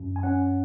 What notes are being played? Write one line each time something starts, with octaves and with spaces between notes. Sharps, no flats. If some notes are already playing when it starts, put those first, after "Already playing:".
Already playing: F#2
G#5
C#4 F#5